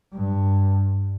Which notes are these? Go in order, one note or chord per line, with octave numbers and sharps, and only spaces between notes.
G2